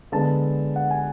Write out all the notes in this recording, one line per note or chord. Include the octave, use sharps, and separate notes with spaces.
D3 G#3 B3 A5
F#5
G#5